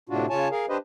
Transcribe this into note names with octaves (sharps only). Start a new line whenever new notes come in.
A2 C3 D4 F4 F#4
C#3 F4 C#5 G#5 A5
G#4 A#4 F5
D4 G4 B4 C5 D#5